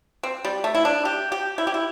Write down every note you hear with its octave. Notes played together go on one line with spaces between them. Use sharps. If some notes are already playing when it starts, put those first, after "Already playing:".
C4
G3
A3
E4
D4
G4
G4
E4
G4
E4